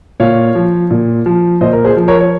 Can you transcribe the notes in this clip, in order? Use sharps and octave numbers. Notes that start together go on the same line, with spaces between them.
A#2 C#5 F5
F3
A#2
F3
A#2 C5 D#5
A#4
G#4 C5
F3
A#4 C#5
C#5